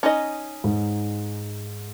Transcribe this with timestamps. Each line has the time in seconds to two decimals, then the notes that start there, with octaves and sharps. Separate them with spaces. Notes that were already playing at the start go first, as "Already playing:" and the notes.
0.03 C#4 D#4 D#5
0.64 G#2